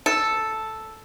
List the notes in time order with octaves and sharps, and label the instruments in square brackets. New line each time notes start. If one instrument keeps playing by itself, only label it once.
[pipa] A4